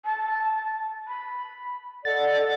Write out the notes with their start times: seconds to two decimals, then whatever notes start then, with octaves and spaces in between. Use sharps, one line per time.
0.05 A5
1.07 B5
2.05 A4 D5 D#5 F#5 A6